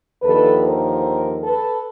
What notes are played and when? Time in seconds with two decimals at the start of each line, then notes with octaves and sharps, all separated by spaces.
0.22 D#2 D3 F3 A4 B4
0.63 A#4 C5
1.43 A4 B4